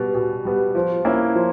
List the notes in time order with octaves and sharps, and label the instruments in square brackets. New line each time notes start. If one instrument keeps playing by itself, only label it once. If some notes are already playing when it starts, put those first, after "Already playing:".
Already playing: [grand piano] B2 G3 B3
B2
G3 B3
F3
A#3 C#4 E4
F3